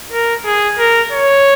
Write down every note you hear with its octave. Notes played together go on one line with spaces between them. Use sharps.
A#4
G#4
A#4
C#5